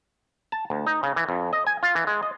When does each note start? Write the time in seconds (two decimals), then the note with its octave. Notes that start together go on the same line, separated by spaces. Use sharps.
0.52 A5
0.70 D2
0.87 D#4
1.03 C#3
1.16 E3
1.29 F2
1.53 D#5
1.67 G#5
1.83 F4
1.95 E3
2.07 G#3
2.23 D#5